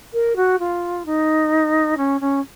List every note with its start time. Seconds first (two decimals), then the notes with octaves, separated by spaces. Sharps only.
0.13 A#4
0.36 F#4
0.59 F4
1.05 D#4
1.97 C#4
2.20 C#4